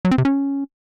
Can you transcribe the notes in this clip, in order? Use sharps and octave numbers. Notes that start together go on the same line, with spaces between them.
F#3
C4
C3
C#4